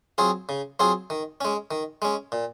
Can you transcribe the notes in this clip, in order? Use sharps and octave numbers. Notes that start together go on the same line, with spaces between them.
F#3 C4 F4 G#4
C#3
F#3 C4 F4 G#4
D#3
G#3 C#4
D#3
G#3 C#4
A#2